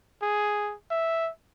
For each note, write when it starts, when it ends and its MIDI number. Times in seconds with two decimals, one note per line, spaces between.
0.22 0.74 68
0.91 1.31 76